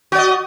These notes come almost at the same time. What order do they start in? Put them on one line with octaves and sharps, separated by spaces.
F#4 D5 D#5